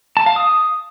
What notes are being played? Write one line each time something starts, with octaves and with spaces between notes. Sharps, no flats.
A5
F5
D#6